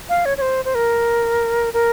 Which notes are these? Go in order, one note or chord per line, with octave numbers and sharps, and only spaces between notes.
F5
C#5
C#5
C5
C5
A#4
A#4